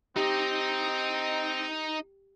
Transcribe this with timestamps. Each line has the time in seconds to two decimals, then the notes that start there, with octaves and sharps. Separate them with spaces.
0.16 C4 D#4 G4 D#5